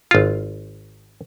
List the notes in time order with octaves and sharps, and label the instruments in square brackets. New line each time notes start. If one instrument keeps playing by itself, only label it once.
[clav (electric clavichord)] G#1 F4